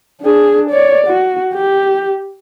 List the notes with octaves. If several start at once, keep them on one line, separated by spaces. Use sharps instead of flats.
D4 G#4
C#5 D5
F#4
G4